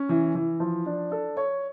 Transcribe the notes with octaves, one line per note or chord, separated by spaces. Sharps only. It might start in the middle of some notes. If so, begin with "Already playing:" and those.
Already playing: C#4
E3
E3
F3
D4
A4
C#5